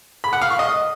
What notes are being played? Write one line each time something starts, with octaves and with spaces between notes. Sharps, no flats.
B5
F#5
F5
C#6
D#5